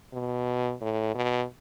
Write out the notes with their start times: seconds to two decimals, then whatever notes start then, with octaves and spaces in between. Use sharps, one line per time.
0.13 B2
0.81 A2
1.15 B2